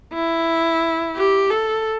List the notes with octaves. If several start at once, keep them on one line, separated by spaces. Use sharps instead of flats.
E4
G4
A4